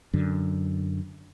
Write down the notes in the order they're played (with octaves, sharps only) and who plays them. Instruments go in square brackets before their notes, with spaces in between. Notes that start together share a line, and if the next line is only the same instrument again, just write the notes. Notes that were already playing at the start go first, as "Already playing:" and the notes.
[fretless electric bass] F#2 D3